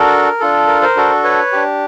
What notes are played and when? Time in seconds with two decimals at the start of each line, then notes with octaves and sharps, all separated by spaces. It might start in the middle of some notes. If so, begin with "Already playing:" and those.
Already playing: D4 F#4 A4 A#4
0.40 D4 F4 A4
0.68 A#4
0.82 A#4 C5
0.96 D4 F#4 A4
1.24 B4 C#5
1.52 D4 G4